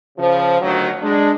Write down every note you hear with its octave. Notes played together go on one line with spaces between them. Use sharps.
C#3 F3
D2 D#3 F#3
G#3 D4